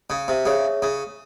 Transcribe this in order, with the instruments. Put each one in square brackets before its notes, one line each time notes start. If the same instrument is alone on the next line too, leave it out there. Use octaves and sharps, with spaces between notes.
[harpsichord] C#3
C3
[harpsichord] C#3 [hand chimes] G#4 C#5 E5
[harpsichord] C#3